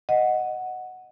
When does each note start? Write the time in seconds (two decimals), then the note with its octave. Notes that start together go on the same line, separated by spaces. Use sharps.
0.09 D#5 F#5